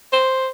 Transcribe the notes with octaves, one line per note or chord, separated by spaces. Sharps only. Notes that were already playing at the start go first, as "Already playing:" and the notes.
C5